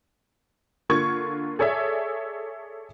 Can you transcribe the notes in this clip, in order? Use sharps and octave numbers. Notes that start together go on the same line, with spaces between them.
D3 A#3 F4 C#6 G#6
G#4 A4 C#5 D5 E5